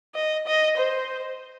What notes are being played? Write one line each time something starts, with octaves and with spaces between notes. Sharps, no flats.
D#5
D#5
C5